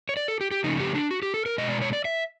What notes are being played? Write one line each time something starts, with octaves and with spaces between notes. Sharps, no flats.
C#5
D5
A4
G4
G4
C#3 F3 A3 C#4 D#4
G4
D4
F#4
G4
A4
A#4
B2 G#3 D#5
D5
C#5
D5
E5